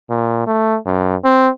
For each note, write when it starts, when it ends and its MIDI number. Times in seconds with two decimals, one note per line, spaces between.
0.10 0.45 46
0.47 0.77 57
0.86 1.16 42
1.25 1.49 60